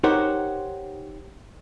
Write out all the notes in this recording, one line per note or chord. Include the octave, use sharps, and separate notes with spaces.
D#4 G4 A#4 C5 C#5 F#5